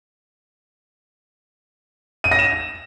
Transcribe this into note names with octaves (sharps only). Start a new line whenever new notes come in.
D#7
A#6
E7